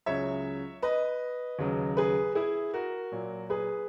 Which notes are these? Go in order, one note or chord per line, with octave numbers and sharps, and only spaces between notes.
C#2 C#3 F#3 C#5 E5
B4 D#5
D#2 C#3 F#3
G#4 B4
E4 G#4
F#4 A#4
A#2 F#3
G#4 B4